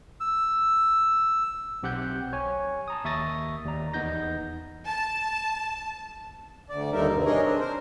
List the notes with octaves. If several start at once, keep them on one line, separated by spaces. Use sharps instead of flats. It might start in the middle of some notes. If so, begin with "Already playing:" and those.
E6
B1 C4 G4 F#5 F#6 G6
C#5 G#5
A5 A#5 D#6
D#2 E5 C#6 D#6 A6 A#6
D#2 D5 A#5
E2 B3 D#4 G6 A#6
A5
D2 D5
D#2 D3 G3 D#4 A#4 E5
G2 C3
D4 D#4 G#4 A#4 C#5 D#5
C4 D4
A#4 C5